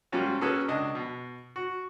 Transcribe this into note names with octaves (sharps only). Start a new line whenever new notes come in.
G#2 G3 A#3 C#4 F4 F#4
A#3 C#4 F#4 G#4 A4 B4
C#2 D4 D#5
B2
F#4